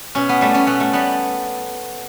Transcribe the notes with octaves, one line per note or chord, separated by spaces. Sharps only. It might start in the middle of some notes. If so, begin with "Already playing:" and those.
B2 C#4
B3
G3 A3
C#4
B2 B3
A3
G3 B3